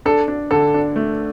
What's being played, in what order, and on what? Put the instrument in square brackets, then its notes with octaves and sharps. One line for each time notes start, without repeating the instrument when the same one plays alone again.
[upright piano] D4 [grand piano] A4
[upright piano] D4
[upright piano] D3 [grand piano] A4
[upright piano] D4
A3